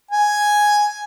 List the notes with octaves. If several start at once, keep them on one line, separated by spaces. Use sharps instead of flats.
G#5